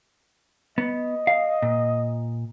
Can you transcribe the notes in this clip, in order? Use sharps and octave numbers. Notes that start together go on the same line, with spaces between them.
B3 D#5
F5
A#2